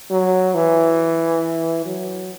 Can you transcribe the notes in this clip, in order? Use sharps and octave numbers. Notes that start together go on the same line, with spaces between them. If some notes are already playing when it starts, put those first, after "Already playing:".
F#3
E3
F#3